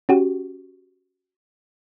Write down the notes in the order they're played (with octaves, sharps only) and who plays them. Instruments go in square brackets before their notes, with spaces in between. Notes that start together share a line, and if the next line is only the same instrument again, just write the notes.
[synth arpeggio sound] C#4 F#4 G4